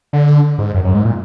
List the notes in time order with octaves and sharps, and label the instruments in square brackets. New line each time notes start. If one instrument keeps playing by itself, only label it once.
[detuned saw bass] D3
G#2
F#2
F#2
G#2
A#2